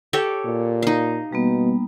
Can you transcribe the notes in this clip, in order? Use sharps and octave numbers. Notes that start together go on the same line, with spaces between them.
G4 A4 C#5
A#2
D#4 F5
B2 G3 A#3 B3